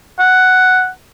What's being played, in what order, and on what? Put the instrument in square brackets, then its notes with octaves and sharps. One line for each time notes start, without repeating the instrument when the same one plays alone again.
[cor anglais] F#5